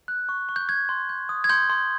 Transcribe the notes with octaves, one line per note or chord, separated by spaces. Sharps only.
F#6
C#6
C#6
G6
G6 G#6
C6
G6
D#6
G#6
C6 G6
C6